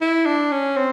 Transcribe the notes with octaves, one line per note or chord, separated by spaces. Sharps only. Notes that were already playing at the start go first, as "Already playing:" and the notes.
E4
D4
C#4
C4